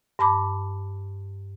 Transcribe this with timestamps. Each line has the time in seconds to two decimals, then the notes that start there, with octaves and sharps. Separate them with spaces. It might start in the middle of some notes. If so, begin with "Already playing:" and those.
0.19 G2 A5 B5 D6